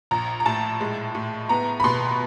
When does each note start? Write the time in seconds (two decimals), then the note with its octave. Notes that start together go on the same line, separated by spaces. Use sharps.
0.11 A#1 A#5
0.40 A#5
0.46 A2 A5
0.81 G#3
1.15 A2
1.49 B3 A#5
1.80 B5
1.84 B2 C6